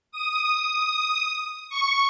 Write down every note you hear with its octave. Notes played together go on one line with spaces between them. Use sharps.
D#6
C#6